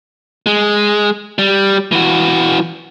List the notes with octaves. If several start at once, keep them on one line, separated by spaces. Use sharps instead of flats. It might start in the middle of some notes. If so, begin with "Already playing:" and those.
G#3
G3
E3 F#4